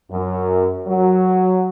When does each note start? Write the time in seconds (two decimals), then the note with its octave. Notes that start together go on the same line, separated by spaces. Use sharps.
0.12 F#2
0.88 F#3